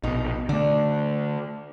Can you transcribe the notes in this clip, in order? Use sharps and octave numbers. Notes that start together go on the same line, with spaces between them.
A#1 B2 D#4
D3 A3 D4